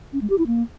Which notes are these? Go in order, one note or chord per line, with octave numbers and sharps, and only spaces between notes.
C#4
G#3
G4
E4
A#3